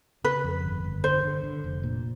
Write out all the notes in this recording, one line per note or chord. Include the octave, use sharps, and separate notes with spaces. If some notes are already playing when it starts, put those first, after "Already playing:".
C#3 B4
F2
G1
G1
D3 C5
D3
D3
F1
A#2